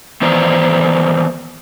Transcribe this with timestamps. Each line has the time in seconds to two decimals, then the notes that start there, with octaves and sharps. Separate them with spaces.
0.22 D#3 E3 B3 C5 D5 A#5